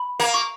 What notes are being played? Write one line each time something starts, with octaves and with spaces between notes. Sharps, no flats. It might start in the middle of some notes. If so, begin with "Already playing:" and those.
Already playing: B5
A#3
C#6